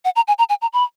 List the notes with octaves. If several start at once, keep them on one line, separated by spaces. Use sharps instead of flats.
F#5
A#5
G#5
A#5
G#5
A#5
B5